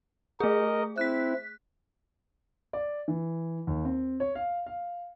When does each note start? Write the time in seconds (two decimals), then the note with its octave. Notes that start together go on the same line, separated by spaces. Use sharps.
0.40 A3 G#4 A#4 D#5
0.98 C4 E4 F#6 B6
2.73 D5
3.08 E3
3.67 D#2
3.85 C4
4.20 C#5
4.35 F5
4.66 F5